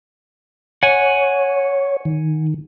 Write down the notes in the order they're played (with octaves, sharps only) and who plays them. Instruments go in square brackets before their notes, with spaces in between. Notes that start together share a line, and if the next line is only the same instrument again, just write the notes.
[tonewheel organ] C#5 [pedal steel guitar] F#5 G#5
[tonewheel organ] D#3